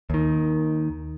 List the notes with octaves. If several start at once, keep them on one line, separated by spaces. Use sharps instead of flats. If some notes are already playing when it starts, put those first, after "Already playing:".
D#2 D#3